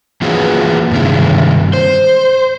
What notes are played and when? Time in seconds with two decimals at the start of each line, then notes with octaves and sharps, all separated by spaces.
0.22 E3 A#3 F4 F#4 G#4 B4
0.91 G2 C3 D#3 G#3 E4
1.73 C5